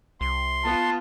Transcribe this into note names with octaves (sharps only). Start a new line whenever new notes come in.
C2 C6
B3 F4 A5